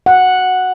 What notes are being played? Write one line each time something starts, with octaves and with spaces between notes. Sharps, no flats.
F#5